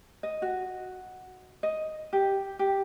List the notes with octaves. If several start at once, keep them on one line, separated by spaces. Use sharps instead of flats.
D#5
F#4
D#5
G4
G4